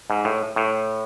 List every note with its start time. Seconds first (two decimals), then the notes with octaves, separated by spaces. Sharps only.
0.10 G#2
0.25 A2
0.56 A2